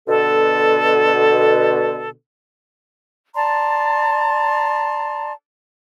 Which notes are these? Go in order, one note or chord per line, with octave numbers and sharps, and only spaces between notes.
B2 D3 A4
D5 A5 A#5 C6